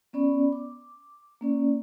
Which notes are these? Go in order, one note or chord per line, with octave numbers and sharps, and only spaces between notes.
B3 C#4 D5 B5
D6
A#3 C#4 D5